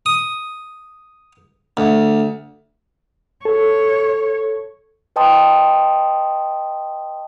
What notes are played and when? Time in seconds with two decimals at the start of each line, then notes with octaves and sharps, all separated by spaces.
0.06 D#6
1.77 D2
3.45 A4 C#5
5.16 B4 D#5 G5 A5 C6 D#6